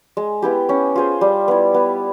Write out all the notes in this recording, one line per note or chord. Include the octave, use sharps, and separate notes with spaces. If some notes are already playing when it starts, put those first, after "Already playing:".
G#3
B3 E4 G4
C#4
F4 G#4 C5
G3
B3 E4
B3